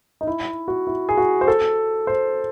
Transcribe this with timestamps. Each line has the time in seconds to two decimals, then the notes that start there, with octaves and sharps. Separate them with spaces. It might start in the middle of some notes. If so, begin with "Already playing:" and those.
0.21 D#4
0.27 E4
0.68 F#4
0.87 E4
1.09 G#4
1.17 F#4
1.41 C5
1.48 A4
2.07 C5